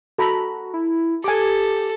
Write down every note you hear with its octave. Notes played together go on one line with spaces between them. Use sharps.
F#4 A4 A#5 B5
E4
G4 A4 G#5 D6